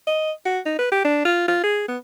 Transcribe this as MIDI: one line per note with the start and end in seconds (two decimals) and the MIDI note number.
0.07 0.31 75
0.45 0.59 66
0.66 0.75 63
0.79 0.87 71
0.92 1.03 67
1.04 1.21 62
1.25 1.47 65
1.48 1.60 65
1.63 1.84 68
1.88 1.97 59